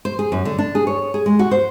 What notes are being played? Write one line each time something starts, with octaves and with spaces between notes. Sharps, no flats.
C5
G#4
F#2
D3
D4
G#4
C#5
G#4
G#3
F#4
C5